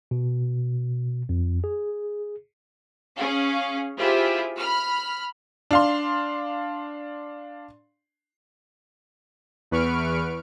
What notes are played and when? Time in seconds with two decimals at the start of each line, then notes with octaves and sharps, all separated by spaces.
0.11 B2
1.29 F2
1.64 G#4
3.15 C#4 G#4 F5
3.99 E4 F4 G4 G#4 C5 E5
4.58 B5 F6
5.71 D4 F5 C6
9.71 E2 B4 C#6 F6 D7